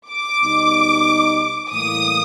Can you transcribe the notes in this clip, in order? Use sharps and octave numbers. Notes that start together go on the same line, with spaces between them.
D6
B2 G3 B3 D#4
A2 E3 G3 A#3 D#6